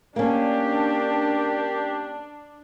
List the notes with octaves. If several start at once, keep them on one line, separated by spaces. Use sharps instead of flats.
A#3 C#4 D4 G4 A#4